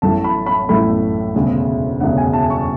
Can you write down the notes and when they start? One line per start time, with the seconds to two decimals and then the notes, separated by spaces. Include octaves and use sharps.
0.02 A1 A2 F#3 A3 A5
0.24 B5
0.46 B5
0.69 A1 A2 F#3 A3 B5
1.35 E1 D2 C#3 G#3
2.00 E1 D2 C#3 G#3 F#5
2.17 G#5
2.33 A5
2.50 C#6